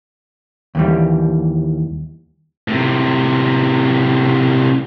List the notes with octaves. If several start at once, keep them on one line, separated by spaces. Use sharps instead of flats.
D#2 E3 G3
A2 C3